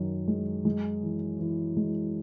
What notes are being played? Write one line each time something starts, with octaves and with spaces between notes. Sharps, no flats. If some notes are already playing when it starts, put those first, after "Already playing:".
Already playing: F#2 D#3
G#3
G#3
E3
E3
G#3